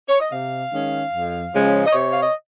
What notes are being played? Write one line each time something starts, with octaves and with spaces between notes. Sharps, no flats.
C#5
D#5
C3 F5
D#3 G#3 C#4
F2
C#3 F3 G#3 C#4
D#5
C3 C#5
F5
D#5